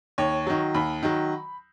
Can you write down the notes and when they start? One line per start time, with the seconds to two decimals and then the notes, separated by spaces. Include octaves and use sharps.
0.18 D#2 C#5
0.47 D#3 F#3
0.74 D#2 B5
1.03 D#3 F#3